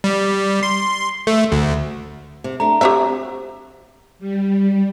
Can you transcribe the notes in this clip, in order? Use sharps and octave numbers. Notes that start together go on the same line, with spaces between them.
G3
C6
A3
D2
C3
A3 D4 A#5
C4 D4 F#4 G4 C#5 E5
G3